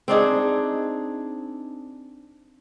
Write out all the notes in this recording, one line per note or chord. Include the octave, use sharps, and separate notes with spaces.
C4 D4 D#4 G#4